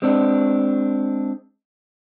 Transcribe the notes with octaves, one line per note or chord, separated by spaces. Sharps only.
G#3 C4 D4